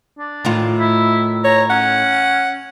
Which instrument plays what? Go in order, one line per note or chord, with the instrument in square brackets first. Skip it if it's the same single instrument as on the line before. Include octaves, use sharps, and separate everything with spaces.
[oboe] D4
[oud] A2 D#3 F4
[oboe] E4
[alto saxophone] C#5 [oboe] A#5
[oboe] C#4 [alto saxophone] F#5